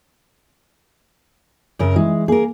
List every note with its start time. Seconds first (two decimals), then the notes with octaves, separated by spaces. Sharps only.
1.79 F#2 C#3 A#4
1.96 E3 G#3 E4
2.28 A#3 G#4 A#4